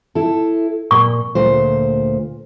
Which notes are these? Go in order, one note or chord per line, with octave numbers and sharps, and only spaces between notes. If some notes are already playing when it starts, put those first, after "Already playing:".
E4 A4
A#2 C#6
D2 A#2 C5